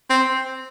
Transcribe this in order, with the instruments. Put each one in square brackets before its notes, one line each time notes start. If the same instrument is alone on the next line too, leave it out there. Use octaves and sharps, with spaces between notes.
[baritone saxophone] C4